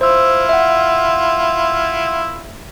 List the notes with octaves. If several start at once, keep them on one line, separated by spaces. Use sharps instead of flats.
E4 F4 C5 E6
E5 F#5